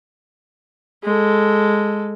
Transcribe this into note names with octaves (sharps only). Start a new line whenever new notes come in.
G#3 A4